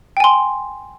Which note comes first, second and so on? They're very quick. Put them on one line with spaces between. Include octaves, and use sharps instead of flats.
G5 G#5 C6